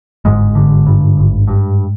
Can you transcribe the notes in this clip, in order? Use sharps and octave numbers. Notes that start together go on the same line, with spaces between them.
G1 G#2 G#3
D3
G2
G#1
G2